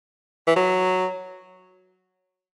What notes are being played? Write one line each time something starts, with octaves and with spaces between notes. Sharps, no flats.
E3
F#3